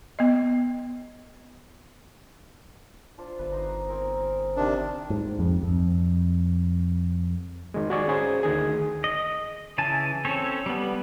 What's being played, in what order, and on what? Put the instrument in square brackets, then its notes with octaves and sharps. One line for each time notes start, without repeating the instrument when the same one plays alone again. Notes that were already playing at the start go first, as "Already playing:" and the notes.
[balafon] B3 D#5
[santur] D4 F4 C5
[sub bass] G1 [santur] B4 E5
[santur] D#4 C5 D#5
C4 A#4 G#5
[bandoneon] C3 D#3 D4
[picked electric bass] G#2
F2
F2
[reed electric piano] D#3 G#3
F#4 G#4 D5 C#6
C#4 G#4 C5
D2 D#3 G#4
[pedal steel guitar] D#5
C#3 E3 G#5 A5
C4 C#4 A4 C#5
G3 B3